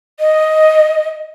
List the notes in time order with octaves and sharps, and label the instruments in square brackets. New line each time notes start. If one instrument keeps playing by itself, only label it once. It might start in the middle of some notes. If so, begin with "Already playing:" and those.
[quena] D#5